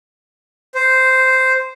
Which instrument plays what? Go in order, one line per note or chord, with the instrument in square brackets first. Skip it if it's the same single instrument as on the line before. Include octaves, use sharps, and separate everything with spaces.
[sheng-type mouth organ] C5